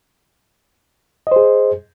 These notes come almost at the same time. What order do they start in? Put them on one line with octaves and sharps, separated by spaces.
D#5 C5 G#4